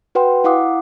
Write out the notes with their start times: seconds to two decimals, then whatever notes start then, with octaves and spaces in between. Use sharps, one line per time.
0.15 F#4 B4 F#5 G5 C6
0.44 E4 F5 F#5 D6 D#6